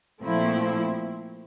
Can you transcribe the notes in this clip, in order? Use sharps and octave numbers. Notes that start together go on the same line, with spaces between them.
A#2 F3 A3 C4 E4